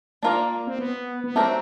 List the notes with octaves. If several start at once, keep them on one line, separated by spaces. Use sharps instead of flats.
A#3 D4 F4 A#4 D5
C4
B3
B3
F#3 A3 C4 D4 G4 A#4